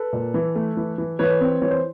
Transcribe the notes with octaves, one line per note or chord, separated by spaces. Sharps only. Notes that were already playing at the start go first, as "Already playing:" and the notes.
Already playing: A4 B4
A#2
E3
A3
E3
E3
E3 B4 C#5
C4
E3 C#5
C5